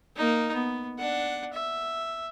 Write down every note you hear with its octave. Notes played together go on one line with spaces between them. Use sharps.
A#3 D#4
B3
D4 F#5
E5